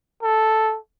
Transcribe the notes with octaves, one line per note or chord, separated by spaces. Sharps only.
A4